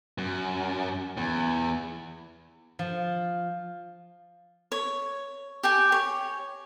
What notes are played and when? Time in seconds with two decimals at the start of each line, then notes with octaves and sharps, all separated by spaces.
0.18 F#2
1.17 E2
2.79 F3
4.72 C#5
5.63 G4 G5 G#5
5.92 C#5